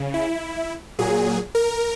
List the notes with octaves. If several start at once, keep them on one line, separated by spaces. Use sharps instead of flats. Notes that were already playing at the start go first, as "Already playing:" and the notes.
Already playing: C#3
E4
A#2 F#3 G#4
A#4